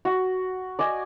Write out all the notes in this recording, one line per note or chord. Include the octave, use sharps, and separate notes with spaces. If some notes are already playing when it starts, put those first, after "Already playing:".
F#4
D5 D#5 G#5